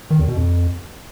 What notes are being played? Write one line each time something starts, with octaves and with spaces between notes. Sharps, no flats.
D#3
E2
B2
F2